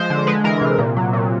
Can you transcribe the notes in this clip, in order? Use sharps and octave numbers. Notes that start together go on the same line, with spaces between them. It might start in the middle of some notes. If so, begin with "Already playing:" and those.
Already playing: F3 G#3 C5
D3
G#3 B4
E3 A#4
C3
A#2
F#3
A#2